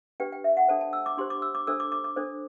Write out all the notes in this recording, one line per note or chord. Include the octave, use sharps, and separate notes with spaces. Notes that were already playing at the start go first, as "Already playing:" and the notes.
D4 G4 B4 G5
G5
E5
F#5
D4 A4 C5 A5
A5
E6
D6
D4 G4 C5 C6
D6
E6
D6
D4 A4 C5 E6
D6
D6
D6
D4 A4 C5